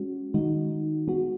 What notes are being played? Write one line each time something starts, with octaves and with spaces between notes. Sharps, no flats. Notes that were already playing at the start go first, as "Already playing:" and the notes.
Already playing: G#3 C#4 F#4
D#3 G#3 D#4 F#4
G#3 B3 F#4